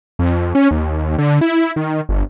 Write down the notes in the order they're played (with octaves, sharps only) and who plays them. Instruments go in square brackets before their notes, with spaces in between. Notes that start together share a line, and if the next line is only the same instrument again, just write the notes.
[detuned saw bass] F2
C#4
D#2
D3
E4
D#3
G1